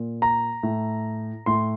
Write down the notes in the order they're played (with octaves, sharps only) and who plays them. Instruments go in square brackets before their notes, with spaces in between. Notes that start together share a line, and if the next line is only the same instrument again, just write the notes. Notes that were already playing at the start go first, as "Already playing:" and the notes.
Already playing: [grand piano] A#2
A#5
A2
A2 C6